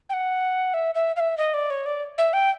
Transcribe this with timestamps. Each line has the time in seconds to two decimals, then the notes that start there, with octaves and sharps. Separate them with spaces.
0.09 G5
0.13 F#5
0.74 E5
0.95 E5
1.16 F5
1.20 E5
1.37 D#5
1.54 D5
1.70 C#5
1.86 D5
2.18 E5
2.33 G5